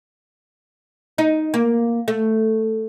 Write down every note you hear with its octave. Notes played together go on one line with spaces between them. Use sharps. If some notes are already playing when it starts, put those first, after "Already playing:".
D#4
A#3
A3